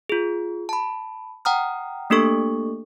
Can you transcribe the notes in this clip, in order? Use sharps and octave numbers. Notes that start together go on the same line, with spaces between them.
F4 G#4
A5 B5
F#5 G5 A#5 D#6 F6
A3 A#3 D4 G4 A4 C#6